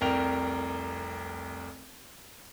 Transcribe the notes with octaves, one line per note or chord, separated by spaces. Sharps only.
F1 C2 A#4 G5 F7